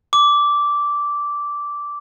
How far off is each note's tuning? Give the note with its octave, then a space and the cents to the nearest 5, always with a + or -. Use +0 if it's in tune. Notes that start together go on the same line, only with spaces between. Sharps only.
D6 -10